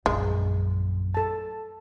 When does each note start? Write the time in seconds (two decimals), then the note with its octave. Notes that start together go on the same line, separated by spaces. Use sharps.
0.06 A#1 F#2 G#3
1.14 A4 A5